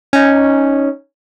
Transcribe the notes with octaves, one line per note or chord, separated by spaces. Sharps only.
C#4 D#4